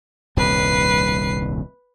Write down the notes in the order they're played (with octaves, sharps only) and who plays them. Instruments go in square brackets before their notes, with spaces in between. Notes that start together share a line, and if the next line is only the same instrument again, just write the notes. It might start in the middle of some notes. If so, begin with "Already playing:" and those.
[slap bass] D#1 C2 G2 [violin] B4 C7